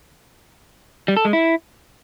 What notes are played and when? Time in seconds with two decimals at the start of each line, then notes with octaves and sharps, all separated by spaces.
1.08 G3
1.17 A4
1.25 G#3
1.33 E4